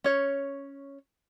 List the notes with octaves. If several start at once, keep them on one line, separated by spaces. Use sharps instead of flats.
C#4 C#5